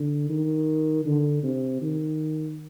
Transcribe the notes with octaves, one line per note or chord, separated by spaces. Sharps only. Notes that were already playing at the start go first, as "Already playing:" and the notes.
Already playing: D3
D#3
D3
C3
D#3